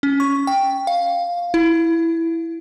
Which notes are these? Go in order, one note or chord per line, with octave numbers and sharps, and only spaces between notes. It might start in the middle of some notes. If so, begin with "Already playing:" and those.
C#4
C#6
G5
F5
E4